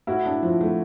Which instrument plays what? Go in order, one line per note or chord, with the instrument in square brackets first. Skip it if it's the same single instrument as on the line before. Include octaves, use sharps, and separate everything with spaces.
[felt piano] A2 [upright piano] E4 F#4
[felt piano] D4
F3
A3